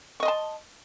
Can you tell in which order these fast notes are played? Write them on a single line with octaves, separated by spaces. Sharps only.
C#6 D#5 C6 A5